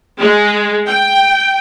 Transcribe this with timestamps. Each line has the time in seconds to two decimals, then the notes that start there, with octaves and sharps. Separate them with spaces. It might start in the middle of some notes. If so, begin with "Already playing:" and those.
0.18 G#3
0.87 G5